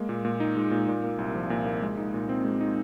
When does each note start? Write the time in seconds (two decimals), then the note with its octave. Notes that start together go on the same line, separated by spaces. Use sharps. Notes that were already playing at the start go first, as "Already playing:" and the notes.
Already playing: G#3 A#3
0.09 A#2
0.25 A#2
0.40 D#4
0.56 G#3
0.71 A#2
0.88 A#2
1.04 A#3
1.18 C2
1.35 F3
1.50 A#2
1.66 A#3
1.82 G#3
1.97 D#4
2.14 A#2
2.29 C4
2.45 G#3
2.60 D#4